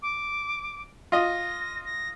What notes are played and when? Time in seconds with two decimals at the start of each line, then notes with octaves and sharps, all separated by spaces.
0.02 D6
1.12 F4 D#5 A#6
1.85 A#6